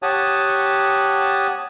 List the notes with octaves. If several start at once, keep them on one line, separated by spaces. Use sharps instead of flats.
G4 C#5 F#5 A5 D#6